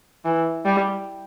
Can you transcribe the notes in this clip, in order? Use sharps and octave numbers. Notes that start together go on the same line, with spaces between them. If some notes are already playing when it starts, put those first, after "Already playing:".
E3
G3